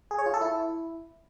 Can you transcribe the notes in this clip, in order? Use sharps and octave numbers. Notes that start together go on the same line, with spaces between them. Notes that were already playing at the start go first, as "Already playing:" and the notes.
G#4
C#5
F4
A4
E4